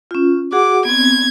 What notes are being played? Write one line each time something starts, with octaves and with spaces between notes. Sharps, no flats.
C#4 F4
F#4 G#4 F#5 D6
B3 C4 G#6